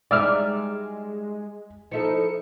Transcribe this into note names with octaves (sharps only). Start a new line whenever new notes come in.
G3 G#3 D#4 D5 E5 F6
F3 D#4 E4 A4 C#7